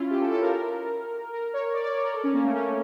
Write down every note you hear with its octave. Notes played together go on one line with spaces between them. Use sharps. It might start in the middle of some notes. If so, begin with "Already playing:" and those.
Already playing: C#4 E4 F4
G4
A4
A4
A#4
A#4
C#5
D5
D5
C#5
A#4
A4
C#4
A#3
A3
C#4